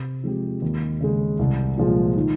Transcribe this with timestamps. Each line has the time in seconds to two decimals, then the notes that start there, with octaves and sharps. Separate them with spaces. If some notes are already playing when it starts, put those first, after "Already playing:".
Already playing: C3
0.24 F3 G#3 C4 G4
0.62 D#2
1.01 C#3 G#3
1.39 C2
1.77 A#2 F3 G#3
2.16 D#3